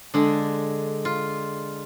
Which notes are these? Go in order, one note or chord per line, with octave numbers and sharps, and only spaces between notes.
D3 G#3 D4
F4